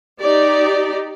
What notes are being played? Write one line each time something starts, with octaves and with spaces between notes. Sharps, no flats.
D#4 G4 D5